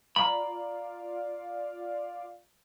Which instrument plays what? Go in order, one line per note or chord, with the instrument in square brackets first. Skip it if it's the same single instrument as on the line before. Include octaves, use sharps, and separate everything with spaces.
[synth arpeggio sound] F4 D5 F5 [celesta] A#5 F#7 [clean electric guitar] B5